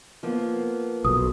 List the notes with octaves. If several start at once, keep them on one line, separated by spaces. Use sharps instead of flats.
F3 A#3 B3
B1 D#6